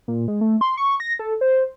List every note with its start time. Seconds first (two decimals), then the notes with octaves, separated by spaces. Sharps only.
0.08 A#2
0.28 G#3
0.41 A3
0.61 C6
0.77 C#6
1.00 A#6
1.19 A4
1.41 C5